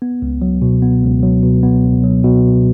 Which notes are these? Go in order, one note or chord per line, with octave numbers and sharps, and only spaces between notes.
B3
C#2
F#3
B2
B3
C#2
F#3
B2
B3
C#2
F#3
B2